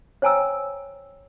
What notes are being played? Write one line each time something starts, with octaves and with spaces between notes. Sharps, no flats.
C5 C#5 G5 G#5 A#5 E6